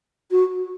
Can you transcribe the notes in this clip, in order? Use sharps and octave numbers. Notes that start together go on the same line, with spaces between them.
F#4